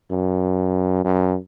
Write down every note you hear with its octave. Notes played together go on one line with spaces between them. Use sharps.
F#2
F#2